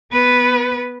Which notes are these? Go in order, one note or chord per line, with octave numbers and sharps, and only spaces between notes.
B3 B4